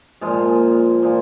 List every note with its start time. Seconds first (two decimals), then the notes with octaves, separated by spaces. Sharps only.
0.21 A#2 F3 G#3 F4
1.03 A#2 F3